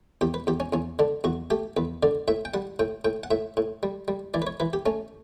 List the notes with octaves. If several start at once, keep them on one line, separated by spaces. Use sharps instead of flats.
E2 G4
B4
E2 G4
C#4
E2 C#4
D3 D4
E2 F#4
A3 G4
E2 B4
D3 D5
A2 E5
G5
G3 F#5
A2 G5
A2 G5
F#5
A2 E5
A2
G3
G3
E3 D5
B4
C#5
E3 B4
G4
A3 C#4